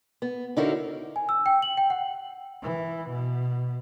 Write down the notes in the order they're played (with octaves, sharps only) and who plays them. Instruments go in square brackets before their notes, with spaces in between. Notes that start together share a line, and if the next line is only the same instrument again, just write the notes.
[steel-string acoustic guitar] B3
D3 C#4 D#4 E4 F#4 A#4
[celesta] G#5
E6
G5
F#7
G5
F#5
[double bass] E3
B2